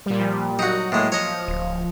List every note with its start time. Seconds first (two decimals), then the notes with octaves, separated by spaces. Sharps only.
0.06 A#2 G3
0.20 F3
0.59 F#3 D#4 F#4
0.92 A2 G#3 A#3
1.12 F3 C#5 D#5
1.48 D1